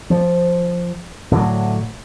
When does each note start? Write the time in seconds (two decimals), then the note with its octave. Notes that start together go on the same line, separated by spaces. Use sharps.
0.10 F3
1.31 A2 D3 F#3